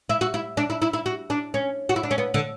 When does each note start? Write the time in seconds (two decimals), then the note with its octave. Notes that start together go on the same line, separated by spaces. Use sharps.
0.09 E4
0.21 F#4
0.34 E4
0.57 D4
0.70 E4
0.82 E4
0.93 E4
1.06 F#4
1.30 D4
1.54 C#4
1.89 F#4
1.96 E4
2.03 D4
2.11 C#4
2.18 B3
2.34 D3